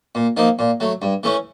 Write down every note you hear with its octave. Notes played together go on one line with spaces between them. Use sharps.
A#2
F3 A#3 D#4
A#2
F#3 A3
G2
E3 A3 C#4